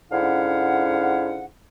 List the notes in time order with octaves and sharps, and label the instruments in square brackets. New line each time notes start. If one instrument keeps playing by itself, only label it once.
[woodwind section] G#2 D3 C#4 E4 F5 F#5